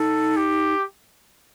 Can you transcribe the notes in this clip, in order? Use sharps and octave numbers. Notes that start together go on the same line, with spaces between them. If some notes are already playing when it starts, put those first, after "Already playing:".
Already playing: D#4 A4
G4